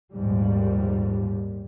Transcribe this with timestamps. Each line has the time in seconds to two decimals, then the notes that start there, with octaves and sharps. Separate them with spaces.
0.13 A#1 D#2 G#2 G3